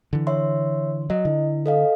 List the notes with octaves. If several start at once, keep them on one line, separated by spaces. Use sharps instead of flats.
D3 E3
C#5 E5 C6
F#3 D#5
D3 E4
A4 D#5 F5